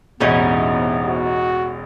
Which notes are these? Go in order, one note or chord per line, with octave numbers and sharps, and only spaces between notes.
E1 A1 C3 B3 C#4 D#4 E4
F#4